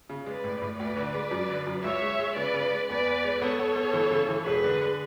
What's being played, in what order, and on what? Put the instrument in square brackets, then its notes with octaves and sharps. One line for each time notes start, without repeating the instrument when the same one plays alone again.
[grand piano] C#3
[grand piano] G#3 [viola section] B4 D5
[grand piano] A2
A2
[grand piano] D2 [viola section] B4 D5
[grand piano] D3
G#3
F#2
D3
F#2
[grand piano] C#2 [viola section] C#5 E5
[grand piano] G#3
G#3
[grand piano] C#3 [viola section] B4 D5
[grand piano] C#3
G#3
[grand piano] E2 [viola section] B4 D5
[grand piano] E2
G#3
[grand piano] B3 [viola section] A4 C#5
[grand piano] B3
B3
E3
C#3
E3
[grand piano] E1 [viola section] G#4 B4
[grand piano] D3
D3